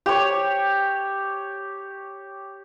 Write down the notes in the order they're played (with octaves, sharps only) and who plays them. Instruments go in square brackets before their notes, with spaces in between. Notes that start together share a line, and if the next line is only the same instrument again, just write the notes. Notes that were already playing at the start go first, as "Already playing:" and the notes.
[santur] G4 C#5